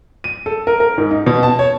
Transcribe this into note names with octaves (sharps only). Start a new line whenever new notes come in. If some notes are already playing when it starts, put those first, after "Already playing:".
D#7
A4
A#4
A#4
G#2
D#4
B2
A5
C#5